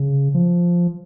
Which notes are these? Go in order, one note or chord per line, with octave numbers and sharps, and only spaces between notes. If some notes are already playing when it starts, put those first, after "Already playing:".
Already playing: C#3
F3